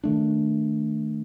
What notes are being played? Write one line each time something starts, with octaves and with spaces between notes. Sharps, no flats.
D#3 A3 D4